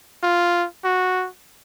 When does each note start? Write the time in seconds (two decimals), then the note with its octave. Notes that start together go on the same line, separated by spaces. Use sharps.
0.23 F4
0.84 F#4